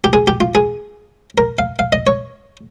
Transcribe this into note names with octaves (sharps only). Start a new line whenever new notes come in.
G4
G#4
G4
F4
G#4
A#4
F5
F5
D#5
C#5